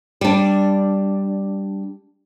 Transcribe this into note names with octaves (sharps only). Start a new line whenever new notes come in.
G3 D4